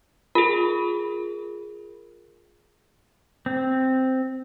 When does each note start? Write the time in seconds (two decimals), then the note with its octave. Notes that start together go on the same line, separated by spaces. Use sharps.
0.35 F4 G#4 A#4
3.46 C4